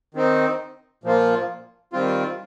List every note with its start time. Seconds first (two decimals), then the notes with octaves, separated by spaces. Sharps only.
0.14 D#3 C4 D#4
1.04 A#2 F3 A#3 F4
1.93 D#3 G3 C4 F4